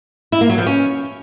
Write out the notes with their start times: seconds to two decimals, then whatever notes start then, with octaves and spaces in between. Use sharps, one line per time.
0.32 E4
0.41 A#3
0.49 F#3
0.58 F3
0.66 C#4